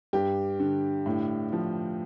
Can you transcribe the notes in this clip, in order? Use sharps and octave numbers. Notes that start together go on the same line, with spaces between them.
G2 G4
D3
A2
F3